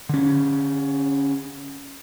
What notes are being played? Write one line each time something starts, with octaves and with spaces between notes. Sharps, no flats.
D3 C#4